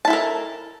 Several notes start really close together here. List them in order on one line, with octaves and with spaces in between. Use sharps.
A5 E4 A4 A#4